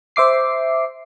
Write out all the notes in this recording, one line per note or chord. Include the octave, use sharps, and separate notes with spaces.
C5 E5 D6 C7